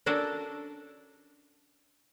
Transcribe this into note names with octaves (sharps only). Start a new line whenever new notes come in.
C#4 D4 F#4 A4 A#4